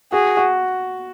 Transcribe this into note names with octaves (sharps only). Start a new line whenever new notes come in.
F#4 G#4
F#4